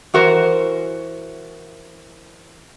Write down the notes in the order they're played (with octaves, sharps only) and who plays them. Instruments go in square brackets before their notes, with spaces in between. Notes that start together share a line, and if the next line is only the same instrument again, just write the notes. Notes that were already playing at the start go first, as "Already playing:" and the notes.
[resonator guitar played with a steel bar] E3 F#4 A#4 C5